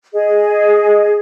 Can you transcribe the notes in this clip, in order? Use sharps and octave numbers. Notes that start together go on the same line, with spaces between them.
G#4 D#5